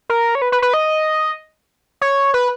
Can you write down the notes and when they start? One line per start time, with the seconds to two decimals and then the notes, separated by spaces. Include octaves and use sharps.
0.10 A#4
0.35 C#5
0.42 B4
0.52 B4
0.62 B4
0.74 D#5
2.01 C#5
2.34 B4